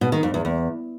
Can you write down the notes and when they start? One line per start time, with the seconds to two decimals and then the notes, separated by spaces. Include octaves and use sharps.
0.01 B2
0.12 D#3
0.23 F2
0.34 E2
0.45 E2